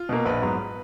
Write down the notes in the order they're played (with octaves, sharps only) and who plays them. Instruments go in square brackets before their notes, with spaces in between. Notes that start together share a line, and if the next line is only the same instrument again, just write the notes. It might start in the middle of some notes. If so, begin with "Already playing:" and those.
Already playing: [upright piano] F4
[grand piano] B2 A#3
[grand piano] A#1 [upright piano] B4
[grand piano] G#2 F#3 B3